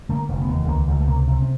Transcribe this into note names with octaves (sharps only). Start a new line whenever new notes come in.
D3 A3
A#3
F1
B3
D#2
C#2 A#3
C#2
A3
C3 A#3
C3
C4